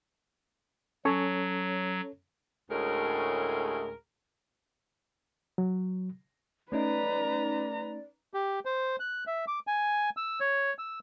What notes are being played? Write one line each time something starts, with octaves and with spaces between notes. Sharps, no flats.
F#3 C#4 A4 C#5
D2 A2 G#3 C#4 G#4 A#4
F#3
A3 C#4 D#4 B4 D5 A#5
G4
C5
F#6
E5
D6
G#5
E6
C#5
E6